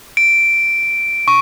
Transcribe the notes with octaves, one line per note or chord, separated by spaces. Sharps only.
D7
C#6